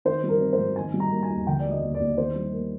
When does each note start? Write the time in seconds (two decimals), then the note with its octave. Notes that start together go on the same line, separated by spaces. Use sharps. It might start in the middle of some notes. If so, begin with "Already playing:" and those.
0.05 D#3 C5
0.23 G3
0.29 A#4
0.40 C4
0.53 C5
0.59 G#2
0.76 D#3 G#5
0.94 G3
1.00 A#5
1.11 A#3
1.23 G#5
1.30 D#2
1.47 D3 G5
1.59 D5
1.65 G#3
1.71 D#5
1.83 D#2
1.95 D5
2.00 D#2
2.18 D#3 C5
2.36 G3
2.53 A#3